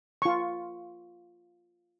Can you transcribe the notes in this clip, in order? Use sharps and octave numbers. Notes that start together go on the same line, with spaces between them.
F4 C#6